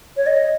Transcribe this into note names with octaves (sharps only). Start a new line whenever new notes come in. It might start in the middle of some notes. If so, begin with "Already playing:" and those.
C#5
D#5